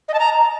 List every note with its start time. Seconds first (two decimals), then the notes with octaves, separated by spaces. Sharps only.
0.08 D#5
0.14 A5
0.19 A#5